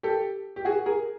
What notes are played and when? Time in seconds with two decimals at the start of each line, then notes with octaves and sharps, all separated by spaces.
0.03 G4 A4
0.56 G4
0.65 F#4 G#4
0.86 G#4 A#4